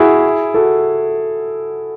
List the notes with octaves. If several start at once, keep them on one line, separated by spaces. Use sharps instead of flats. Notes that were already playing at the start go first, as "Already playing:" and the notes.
Already playing: E4 F#4 G#4
F#4 A4